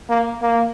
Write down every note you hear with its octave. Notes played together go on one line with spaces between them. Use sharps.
A#3
A#3